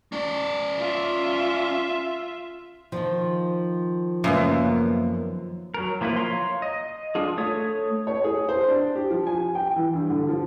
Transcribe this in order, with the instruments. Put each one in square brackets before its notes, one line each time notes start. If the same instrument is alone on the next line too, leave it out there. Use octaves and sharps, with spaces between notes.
[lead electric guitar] C#4 D5
[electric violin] F4 E5
[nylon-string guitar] D#3 F3 [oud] F4
[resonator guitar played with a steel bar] F#2 [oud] C#3 A#3 B3
[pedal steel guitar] F#3 A#4
F3 A#3 E4 F4 B4
C#5 F5 A#5 C6
D#5
D4 F4 G#4
A3 C#5 D#6
[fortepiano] C#5
G#4
C5
D4
G4
F3
G#5
G5
E3
G2
D3
F3